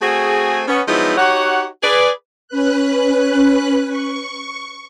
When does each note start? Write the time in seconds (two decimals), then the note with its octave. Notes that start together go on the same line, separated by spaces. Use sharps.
0.01 A3 C4 F#4 G#4
0.67 B3 C#4
0.87 F3 F#3 G#3 B3 D#4 E4
1.17 D#4 F#4 G4 C#5 F#5
1.83 G#4 B4 D5
2.48 C#4 B4 F#6
3.88 C#6